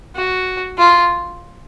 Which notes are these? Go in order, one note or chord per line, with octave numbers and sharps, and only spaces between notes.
F#4
F4